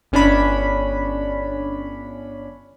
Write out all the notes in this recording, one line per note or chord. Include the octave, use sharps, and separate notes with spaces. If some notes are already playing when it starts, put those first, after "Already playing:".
G1 C#4 D4 B5